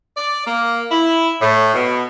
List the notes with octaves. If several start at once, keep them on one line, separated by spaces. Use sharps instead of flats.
D5
A#3
E4
A2
B2